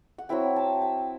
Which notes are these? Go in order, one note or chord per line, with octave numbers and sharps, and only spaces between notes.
F#5
F#3 C4 E4 G5
A5
G5